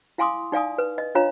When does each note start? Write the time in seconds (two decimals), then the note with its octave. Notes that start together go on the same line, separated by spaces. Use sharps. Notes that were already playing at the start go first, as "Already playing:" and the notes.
0.18 E4 F5 G#5 C6 D6 D#6
0.52 D#4 D5 F5 G#5 D#6
0.78 B4
0.98 D#5
1.15 D4 F4 C#5 F5 A#5